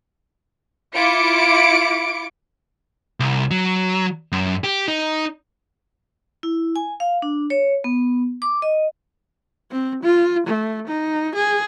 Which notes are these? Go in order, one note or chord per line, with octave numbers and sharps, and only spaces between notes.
E4 F4 D6 C#7 D7
C2
F#3
F#2
G4
D#4
E4
G#5
F5
D4
C#5
B3
D6
D#5
C4
F4
A3
D#4
G#4